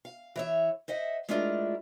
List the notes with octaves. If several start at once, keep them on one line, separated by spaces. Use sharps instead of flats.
F5
E3 C#5 E5
C5 D#5 E5 F#5
G#3 A3 D4 E4 F4 A#4